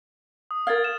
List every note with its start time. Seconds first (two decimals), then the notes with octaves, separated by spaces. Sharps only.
0.51 D#6
0.67 A#4 F5 F6 G#6 A6
0.84 E7